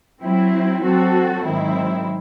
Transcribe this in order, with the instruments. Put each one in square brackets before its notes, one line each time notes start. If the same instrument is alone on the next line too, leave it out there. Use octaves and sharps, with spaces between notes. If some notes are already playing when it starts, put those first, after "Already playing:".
[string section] F#3 C4 E4
F#3 C4 F#4 A4
G#2 D#3 F#3 C4 E4